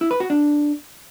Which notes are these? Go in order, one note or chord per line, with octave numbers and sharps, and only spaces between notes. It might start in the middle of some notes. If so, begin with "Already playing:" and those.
E4
B4
F#4
D4